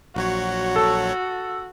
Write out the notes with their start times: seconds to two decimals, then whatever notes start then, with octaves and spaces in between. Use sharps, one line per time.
0.16 A#1 F#3 F#4 C#5
0.76 A4